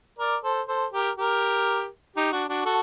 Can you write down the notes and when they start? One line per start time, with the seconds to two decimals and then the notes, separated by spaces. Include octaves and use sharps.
0.19 A#4 D5
0.44 A4 C5
0.68 A4 C5
0.92 G4 A#4
1.17 G4 A#4
2.16 D#4 G4
2.32 D4 F#4
2.49 D4 F#4
2.65 F#4 A4